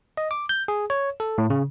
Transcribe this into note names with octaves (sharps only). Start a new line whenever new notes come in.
D#5
D6
G6
G#4
C#5
A4
A2
C#3